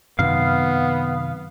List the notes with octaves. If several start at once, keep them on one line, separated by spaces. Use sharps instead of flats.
F#2 C3 D#3 B3 F5